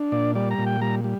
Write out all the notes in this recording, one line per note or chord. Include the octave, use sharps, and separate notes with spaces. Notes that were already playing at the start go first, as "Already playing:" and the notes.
Already playing: D4
A#2 D5
G3 D5
A#5
A#2
G5
G3 A#5
G3